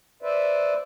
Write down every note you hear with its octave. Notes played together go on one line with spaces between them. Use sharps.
B4 C5 D5 E5